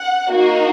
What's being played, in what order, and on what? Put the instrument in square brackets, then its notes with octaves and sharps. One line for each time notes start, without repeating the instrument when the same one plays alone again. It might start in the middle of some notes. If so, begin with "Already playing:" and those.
Already playing: [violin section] F#5
A#3 D#4 F#4